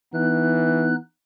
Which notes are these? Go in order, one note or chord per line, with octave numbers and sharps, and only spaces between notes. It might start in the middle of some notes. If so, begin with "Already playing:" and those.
E3 B3 D#4 F#6